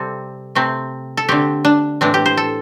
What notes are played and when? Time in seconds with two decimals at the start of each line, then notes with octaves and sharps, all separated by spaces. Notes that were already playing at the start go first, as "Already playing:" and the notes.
Already playing: C3 G3 C4 A4
0.55 C3 A3 C4
1.17 A4
1.28 D3 A3 C4 G4
1.65 D4
2.01 A2 E3 C4 D4
2.14 G4
2.26 C5
2.37 A4